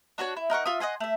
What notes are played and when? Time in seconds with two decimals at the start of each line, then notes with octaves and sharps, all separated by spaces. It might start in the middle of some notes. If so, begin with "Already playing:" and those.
0.18 D4 F#4 A#4 C#5
0.37 E4
0.50 D#4 A#4 F#5 C#6
0.66 F4 E5 D#6
0.80 D#5 F#5 G#5 C6
1.00 A3 E5